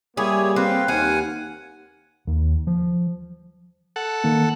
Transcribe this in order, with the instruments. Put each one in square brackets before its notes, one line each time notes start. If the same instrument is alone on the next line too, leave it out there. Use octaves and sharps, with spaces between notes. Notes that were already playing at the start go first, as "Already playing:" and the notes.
[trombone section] G3 A#3 [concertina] E4 G4 C#5 [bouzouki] G#4
[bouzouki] C4 [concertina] B4 F5
[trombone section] D#2 [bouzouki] F5 [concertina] F#5 G#5
[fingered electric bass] D#2
F3
[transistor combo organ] A4 F#5
[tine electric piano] D#3 A#3